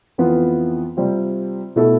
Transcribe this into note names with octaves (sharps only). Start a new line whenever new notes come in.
F2 E3 B3 F4
C3 G3 C4 F4
B2 A3 E4 A4